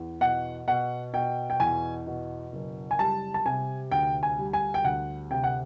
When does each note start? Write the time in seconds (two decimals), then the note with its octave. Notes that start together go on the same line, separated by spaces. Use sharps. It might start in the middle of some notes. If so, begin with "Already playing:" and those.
Already playing: E2
0.21 B2 F#5
0.68 B2 F#5
1.13 B2 G5
1.50 G5
1.60 E2 G#5
2.07 B2
2.53 F#1
2.91 G#5
2.99 G3 A5
3.34 A5
3.46 C3 G#5
3.91 D2 G5
4.23 G#5
4.38 G3
4.53 G#5
4.74 G5
4.84 D2 F#5
5.31 C3 G5
5.44 F#5